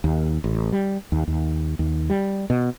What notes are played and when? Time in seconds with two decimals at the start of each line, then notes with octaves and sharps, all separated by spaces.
0.04 D#2
0.44 A1
0.72 G3
1.12 D#2
1.28 D#2
1.79 D#2
2.10 G3
2.50 B2